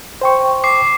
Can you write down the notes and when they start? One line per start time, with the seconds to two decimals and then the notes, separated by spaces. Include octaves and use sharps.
0.21 C5 G5 C#6
0.64 D6 C7